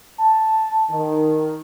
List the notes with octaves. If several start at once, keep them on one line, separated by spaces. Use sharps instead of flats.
A5
D#3